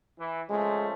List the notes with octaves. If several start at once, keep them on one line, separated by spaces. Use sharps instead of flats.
E3
C#3 F3 G#3 A3